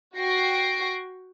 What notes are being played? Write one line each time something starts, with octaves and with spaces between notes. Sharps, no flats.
F#4 G5 C#6 A#6 C7 D7